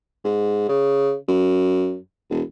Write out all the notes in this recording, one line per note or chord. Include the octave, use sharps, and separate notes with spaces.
G#2
C#3
F#2
E1